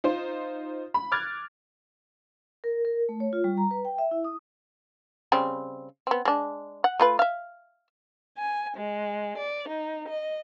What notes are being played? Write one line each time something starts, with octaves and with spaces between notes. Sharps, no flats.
D#4 F4 C5
B5
D6 F6 F#6 G#6 A6
A#4
A#4
A3
C#5
F4
G3
A#5
B4
G5
E5
E4
D#6
C#3 G3 C4
B3 C4
G#3 D4
F#5
A3 F4 B4
E5 F5
G#5
G#3
D5
D#4
D#5